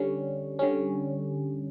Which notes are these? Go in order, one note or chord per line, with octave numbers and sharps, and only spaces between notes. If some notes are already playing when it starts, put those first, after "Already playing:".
Already playing: D3 G3 C#4
D3 G3 C#4